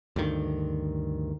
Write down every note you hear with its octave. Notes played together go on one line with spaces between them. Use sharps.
D2 G2 D#3